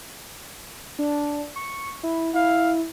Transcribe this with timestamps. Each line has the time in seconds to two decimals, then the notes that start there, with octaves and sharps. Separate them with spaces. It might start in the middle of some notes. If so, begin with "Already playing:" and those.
0.99 D4
1.56 C#6
2.03 E4
2.34 E4 F5